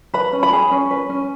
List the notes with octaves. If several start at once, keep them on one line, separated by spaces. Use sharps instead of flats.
B4 B5
C#4
B5
G#4
C#4
B4
C#4